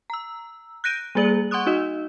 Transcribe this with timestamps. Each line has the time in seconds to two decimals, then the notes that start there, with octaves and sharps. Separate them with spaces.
0.10 A#5 E6
0.84 F#6 G6 A#6 D7 D#7
1.15 G3 A#3 G#4 D5 F#7
1.51 F#5 C6 C#6 D#6 F#6
1.66 D#4 F#4 D#5